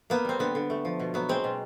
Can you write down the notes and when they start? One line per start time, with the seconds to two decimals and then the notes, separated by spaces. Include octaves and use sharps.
0.10 A#3 B3
0.25 G3 C4
0.39 D3 B3
0.55 D3
0.70 A3
0.85 F3
1.00 B2
1.14 F#3 B3
1.29 G#3 C4
1.44 B2